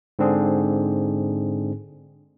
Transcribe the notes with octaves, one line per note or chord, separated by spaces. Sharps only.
G#2 D3 C4 D4 G#4